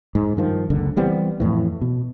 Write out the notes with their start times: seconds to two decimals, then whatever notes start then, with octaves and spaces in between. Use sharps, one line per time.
0.15 G#2
0.37 G2 D#3 F3
0.70 F#1 C#2 D3
0.97 E3 G3 B3 C4
1.40 F2 A2 E3
1.81 B2